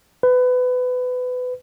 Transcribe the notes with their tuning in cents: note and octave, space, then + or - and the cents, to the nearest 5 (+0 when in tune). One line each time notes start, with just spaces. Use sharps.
B4 +25